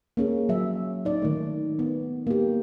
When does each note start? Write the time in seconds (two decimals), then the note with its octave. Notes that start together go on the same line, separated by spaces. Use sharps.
0.17 A#3 C#4 G#4
0.49 F#3 E5
1.05 D#4 D5
1.22 D#3 A3
1.79 B3
2.27 A#3 G4